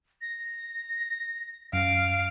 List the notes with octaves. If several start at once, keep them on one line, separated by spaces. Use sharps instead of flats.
A#6
F#2 F5 D7